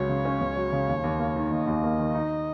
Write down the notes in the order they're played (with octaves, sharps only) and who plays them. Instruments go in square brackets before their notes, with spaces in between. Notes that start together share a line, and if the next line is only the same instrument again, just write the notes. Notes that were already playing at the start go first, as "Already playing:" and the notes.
Already playing: [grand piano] C#2 F#3 C#4 [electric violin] C#5
[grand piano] C#3
C#4
C#2
F#3
C#3
D#2
D#2
A#3
D#3
[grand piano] D#2 [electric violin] D#5
[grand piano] D#2
A#3
D#3
D#4